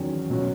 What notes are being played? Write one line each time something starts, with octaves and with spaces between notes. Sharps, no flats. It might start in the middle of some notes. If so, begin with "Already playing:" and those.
Already playing: E2 D#3 F#3 C#4
B2 F#3 C#4